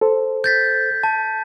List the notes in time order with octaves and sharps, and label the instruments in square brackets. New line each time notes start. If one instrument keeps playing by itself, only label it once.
[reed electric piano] A4 C5
[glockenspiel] G6 A6 B6
A5